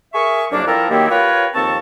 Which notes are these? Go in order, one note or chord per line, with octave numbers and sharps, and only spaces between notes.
G#4 A#4 E5 C#6
C2 F2 F#3 A#3 D4
F3 C4 E4 A4 A#4
D#3 F#3 A#3 C4 E4 G4
F4 G4 A#4 B4 C#5
D#2 F3 C4 A4 A5 C#6